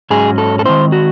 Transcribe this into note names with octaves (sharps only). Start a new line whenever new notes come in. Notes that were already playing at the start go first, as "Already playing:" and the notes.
G#2 F#3 C#4 G#4
A4
A4
D#3 G#3 C4 E4 C5
F#4